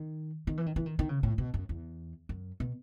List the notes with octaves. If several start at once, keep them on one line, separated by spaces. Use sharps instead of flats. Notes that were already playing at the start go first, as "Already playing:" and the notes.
Already playing: D#3
D#3
E3
D#3
E3
D#3
D#3
C#3
A2
B2
F#2
E2
F#2
B2